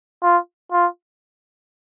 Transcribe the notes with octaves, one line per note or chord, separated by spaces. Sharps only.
F4
F4